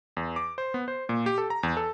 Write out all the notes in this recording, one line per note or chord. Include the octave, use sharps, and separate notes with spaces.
E2
D6
C5
B3
C5
A#2
G4
A4
A#5
E2
A4